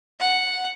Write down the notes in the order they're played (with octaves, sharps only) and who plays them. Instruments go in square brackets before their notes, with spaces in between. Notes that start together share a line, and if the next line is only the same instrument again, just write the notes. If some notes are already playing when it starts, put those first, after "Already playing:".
[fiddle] F#5